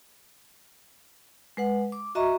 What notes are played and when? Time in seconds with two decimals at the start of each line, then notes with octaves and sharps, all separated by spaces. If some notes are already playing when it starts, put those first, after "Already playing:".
1.57 G#3 B4 F#5
1.92 D6
2.15 F#4 D#5 E5 A#5 C#6